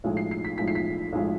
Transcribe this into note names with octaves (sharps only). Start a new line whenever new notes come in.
B1 A2 F3 G#3
C7
C7
B6
B1 A2 F3 G#3 B6
C7
B6
B1 A2 F3 G#3